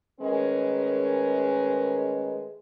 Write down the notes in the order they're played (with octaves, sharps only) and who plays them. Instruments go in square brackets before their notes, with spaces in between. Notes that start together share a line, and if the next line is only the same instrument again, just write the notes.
[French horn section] D#3 G#3 A3 C#4 A#4 B4